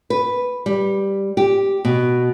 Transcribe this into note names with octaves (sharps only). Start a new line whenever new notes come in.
B4
G3
G4
B2